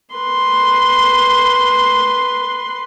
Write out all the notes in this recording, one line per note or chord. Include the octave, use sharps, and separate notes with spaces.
B4 C6